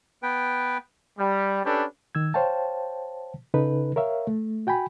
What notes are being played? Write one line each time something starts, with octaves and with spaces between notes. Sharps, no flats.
B3 B4 G5
G3
C#4 D4 G4 A4 B4
D#3 E6 G#6
C5 C#5 F5 G5 A5
C#3 D#4 A4 B4
A#4 C#5 E5 F5
A3
F#4 G5 G#5 B5